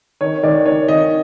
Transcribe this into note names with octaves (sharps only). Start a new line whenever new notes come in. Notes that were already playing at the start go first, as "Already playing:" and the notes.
D#3 C#5
D#3 D5
D#3 C#5
D#3 D#5